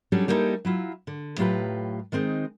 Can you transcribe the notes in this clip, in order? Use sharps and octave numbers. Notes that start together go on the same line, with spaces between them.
F#3 G3 C#4 D4 A4
G3 A#3 B3 D#4 E4 A4
F#3 E4 F4
D3
A2 F#3 F4 G4 B4 A#5
D#3 G#3 C4 D#4